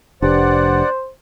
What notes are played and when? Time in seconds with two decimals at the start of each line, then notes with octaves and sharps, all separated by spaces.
0.22 F1 D4 G4 B4 C5 D5 F#5